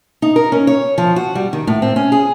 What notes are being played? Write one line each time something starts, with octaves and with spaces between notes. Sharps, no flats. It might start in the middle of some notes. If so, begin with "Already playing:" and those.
D#4
A#4
C#4
C#5
F3
F#4
G3
D#3
A2
C4
C#4
G#4